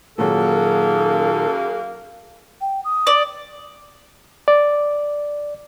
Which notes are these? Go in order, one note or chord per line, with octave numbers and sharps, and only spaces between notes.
F#2 A#2 D#3 F#3 A#3 G#4 A4
G5
D#6
D5
D5